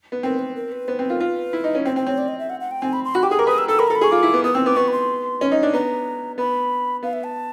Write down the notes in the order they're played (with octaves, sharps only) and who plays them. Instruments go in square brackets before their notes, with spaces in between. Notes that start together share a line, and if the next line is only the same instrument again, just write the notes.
[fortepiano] B3
[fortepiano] C4 [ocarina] A#4
[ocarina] B4
A#4
B4
[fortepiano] B3 [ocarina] C5
[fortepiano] C4 [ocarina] B4
[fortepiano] F4 [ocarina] A#4
[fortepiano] F4 [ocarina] B4
[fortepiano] E4
D#4
C#4
[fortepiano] C4 [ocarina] C5
[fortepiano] C4 [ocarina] C5
[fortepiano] C4 [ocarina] C#5
[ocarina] D5
D#5
E5
F#5
F#5
G5
[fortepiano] C4 [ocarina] G#5
[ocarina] B5
C6
[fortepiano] F#4 [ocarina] B5
[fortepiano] G4 [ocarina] D6
[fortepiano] G#4 [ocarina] D#6
[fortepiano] A#4 [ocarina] D6
[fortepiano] B4 [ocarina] D#6
[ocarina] E6
[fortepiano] A4 [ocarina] E6
[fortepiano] A#4 [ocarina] B5
[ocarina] A#5
[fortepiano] A4
[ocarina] B5
[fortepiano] G#4 [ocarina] C#6
[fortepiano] F4 [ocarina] D6
[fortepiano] E4
B3
[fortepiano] B3 [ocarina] D#6
[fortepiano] C4 [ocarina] E6
[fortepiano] B3 [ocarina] D6
[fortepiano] B3 [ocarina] C#6
[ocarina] B5
C6
[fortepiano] C#4
D#4
D4
[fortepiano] B3 [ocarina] A#5
[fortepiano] B3 [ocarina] B5
[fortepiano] B3 [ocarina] F5
[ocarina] E5
A5